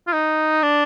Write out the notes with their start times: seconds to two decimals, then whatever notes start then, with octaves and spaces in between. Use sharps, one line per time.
0.07 F4
0.13 D#4
0.63 D4